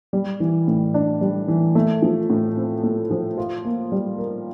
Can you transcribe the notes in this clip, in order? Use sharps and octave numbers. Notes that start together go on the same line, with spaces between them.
G3
E3
A2
D4
G3
E3
A3
F3
A2
C4
A3
F3
F4
A#3
G3
A#4